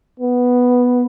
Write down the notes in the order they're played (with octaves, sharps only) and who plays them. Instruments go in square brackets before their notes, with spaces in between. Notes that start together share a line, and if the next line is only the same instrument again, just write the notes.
[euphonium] B3